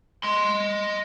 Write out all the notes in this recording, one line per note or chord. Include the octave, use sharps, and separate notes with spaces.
D#5 C6